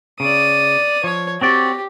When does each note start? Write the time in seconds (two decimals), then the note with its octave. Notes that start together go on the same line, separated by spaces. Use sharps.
0.20 C#3 D5 D#6
1.04 F3 C#5
1.41 C4 F#4 G4 D5